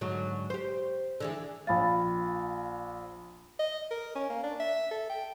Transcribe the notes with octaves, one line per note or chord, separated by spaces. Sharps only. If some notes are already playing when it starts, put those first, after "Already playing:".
G#2 D3 F#3
G4 C5
D3 E3 G#3
A#1 F5 B5 A6
D#5
A#4
C#4
A#3
D4
E5
A4
G5